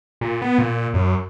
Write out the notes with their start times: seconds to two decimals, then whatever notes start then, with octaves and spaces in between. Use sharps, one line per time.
0.21 A#2
0.42 B3
0.58 A#2
0.94 F#2